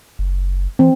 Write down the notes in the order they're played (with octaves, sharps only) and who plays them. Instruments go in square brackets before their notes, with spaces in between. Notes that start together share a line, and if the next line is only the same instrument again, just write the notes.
[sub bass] F#1
[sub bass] E3 [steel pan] C4